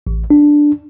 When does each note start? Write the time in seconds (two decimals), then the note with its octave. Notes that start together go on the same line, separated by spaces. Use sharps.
0.07 A1
0.30 D4